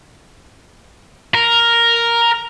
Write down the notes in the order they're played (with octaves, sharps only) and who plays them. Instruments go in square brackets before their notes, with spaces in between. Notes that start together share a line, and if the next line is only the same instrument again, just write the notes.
[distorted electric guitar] A#4